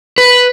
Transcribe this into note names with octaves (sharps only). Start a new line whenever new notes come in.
B4